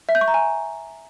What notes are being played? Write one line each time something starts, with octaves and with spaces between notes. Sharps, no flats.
E5
G6
C#6
A#5
G#5